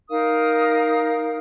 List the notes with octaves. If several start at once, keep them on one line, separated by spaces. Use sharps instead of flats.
D#4 A#4 F5 D#6